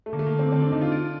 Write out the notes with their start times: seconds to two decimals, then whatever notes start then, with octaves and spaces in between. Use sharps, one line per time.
0.06 A3
0.13 D3 A#3
0.19 A3
0.26 A#3
0.33 D3
0.39 C4
0.52 D3 C4
0.62 D4
0.72 D3 D#4
0.81 F4
0.92 D4 F4